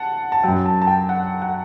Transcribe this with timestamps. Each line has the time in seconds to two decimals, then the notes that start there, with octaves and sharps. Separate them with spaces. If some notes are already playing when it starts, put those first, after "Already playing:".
Already playing: F#5 A5
0.32 A5
0.43 F#2 F#3 G5
0.66 A5
0.82 A5
0.87 G5
1.09 F#5
1.42 F#5